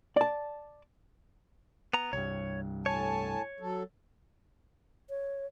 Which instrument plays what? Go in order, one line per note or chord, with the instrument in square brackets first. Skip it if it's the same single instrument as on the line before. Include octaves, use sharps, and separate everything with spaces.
[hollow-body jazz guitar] D5 A5
[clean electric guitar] B3 A#5
[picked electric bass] C2 G2 [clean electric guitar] C#5
[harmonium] A2 G#5 A5 [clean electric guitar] C#5
[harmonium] F#3 A4
[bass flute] C#5